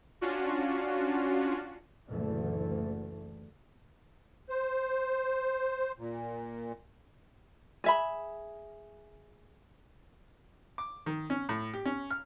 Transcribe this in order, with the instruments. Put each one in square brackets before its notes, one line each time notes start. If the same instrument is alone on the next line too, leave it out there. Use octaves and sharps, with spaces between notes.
[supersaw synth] C#4 D4 F4 F#4
[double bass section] F#1 D2 A#2 D3 E3 A3
[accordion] C5
A#2
[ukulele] G#4 E5 B5
[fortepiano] D6
D#3
C#4
A2
G4
C#4
F6